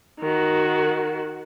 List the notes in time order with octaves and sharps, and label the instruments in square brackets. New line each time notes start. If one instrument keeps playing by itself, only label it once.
[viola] D#3 F#4